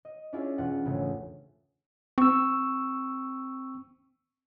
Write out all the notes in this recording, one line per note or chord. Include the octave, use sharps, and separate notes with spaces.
D#5
C#4 D4 E4 F4 G#4
E1 F4 F#5
G#1 C#3 A3
C4 C#6 E6